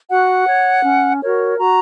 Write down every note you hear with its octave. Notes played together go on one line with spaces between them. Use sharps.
F#4 F#5
C#5
C#4
F#4 A#4 C#5
F#4 A#5